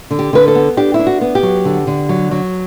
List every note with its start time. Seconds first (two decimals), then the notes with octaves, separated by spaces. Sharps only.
0.11 D3
0.19 G4
0.33 D3 B4
0.48 A4
0.55 B3
0.77 D4 G4
0.94 E4
0.99 D4
1.07 F#4
1.21 B3
1.35 G4
1.43 F#3
1.65 D3
1.87 D3
2.09 F#3
2.31 F#3